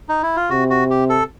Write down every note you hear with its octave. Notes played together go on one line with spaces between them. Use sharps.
D#4
E4
F4
C3 F#4
F#4
G4
A4